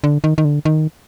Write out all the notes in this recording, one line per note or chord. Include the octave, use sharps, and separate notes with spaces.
D3
D#3
D#3
D3
D#3